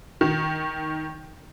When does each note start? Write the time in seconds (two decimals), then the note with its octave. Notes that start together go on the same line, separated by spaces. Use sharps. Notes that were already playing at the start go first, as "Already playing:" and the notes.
0.21 D#3